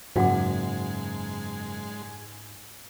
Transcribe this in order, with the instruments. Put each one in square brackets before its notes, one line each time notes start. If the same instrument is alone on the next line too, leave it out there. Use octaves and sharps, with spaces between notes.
[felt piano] F#1 [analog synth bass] G#2 [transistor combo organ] G#3 [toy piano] F#4 F#5 D6